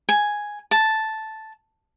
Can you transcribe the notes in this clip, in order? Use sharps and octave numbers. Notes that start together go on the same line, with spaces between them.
G#5
A5